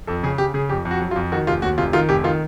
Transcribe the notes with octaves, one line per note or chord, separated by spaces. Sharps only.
F2 A4
C#3 G#4
C#3 G4
C#3 G#4
F2 G4
F2
F#4
F#3
F4
F2
D#3 F#4
F1 F4
D#2 F#4
F1 F4
D#3 F4
F1 G4
D#3 F4